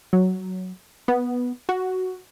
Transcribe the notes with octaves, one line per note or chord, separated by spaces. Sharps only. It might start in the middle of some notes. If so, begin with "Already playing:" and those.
F#3
B3
F#4